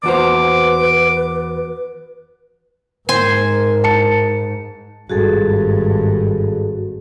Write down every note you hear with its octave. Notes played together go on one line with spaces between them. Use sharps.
E2 F#4 B4 C5 D6
G#2 A#4 C5 G#5
A5 C#7
G#1 G2 F#4 G#4 A4